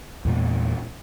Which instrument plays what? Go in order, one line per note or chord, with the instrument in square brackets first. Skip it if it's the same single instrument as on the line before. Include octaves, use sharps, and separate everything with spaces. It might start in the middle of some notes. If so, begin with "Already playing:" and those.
[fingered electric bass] E2 A#2 G#3